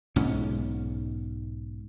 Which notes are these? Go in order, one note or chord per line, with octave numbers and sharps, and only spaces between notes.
B1 G#2 C#4